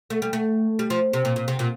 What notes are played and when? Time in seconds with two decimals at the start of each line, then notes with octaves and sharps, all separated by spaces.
0.10 A3
0.22 G3
0.33 A3
0.79 G3
0.90 F3
1.13 C3
1.25 A#2
1.36 A#2
1.48 C3
1.59 A#2